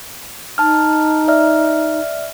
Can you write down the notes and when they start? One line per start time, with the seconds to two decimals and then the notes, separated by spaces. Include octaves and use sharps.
0.58 D#4 A5 F6
1.28 D5 E5 F6